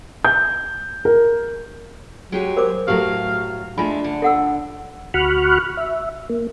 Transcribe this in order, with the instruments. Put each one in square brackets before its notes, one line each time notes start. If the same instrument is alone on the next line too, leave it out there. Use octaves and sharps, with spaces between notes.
[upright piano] G6
A#4
[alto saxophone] F#3 [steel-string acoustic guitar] G#3 G4 G#4
[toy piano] A#4 C5 D6
[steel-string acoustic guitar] A2 F#3 [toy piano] G4 A4 [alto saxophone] F5
[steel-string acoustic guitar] G#3 A3 [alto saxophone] D4 [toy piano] F4 G#5 B5
[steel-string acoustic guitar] D3
[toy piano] A4 F#5 E6
[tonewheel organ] D2 F#4 B5 C#6 F6 F#6
E5
A#3